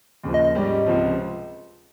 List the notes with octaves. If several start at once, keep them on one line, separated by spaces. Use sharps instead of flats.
D#2 C#3 F3
D#5
D#5
G#2 G3 C#4 G4
C#2 C3 F3